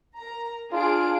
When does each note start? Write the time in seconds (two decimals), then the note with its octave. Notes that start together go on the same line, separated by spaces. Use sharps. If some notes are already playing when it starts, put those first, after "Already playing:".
0.16 A#4 A#5
0.72 D4 F4 G#4 D7